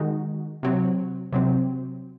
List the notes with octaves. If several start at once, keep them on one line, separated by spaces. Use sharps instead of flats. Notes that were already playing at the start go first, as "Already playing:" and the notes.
Already playing: D#3 G#3 D#4 F#4
C3 F#3 C4
C3 F#3 C4